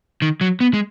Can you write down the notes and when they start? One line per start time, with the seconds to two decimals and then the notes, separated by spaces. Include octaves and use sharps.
0.22 D#3
0.41 F#3
0.60 B3
0.74 G#3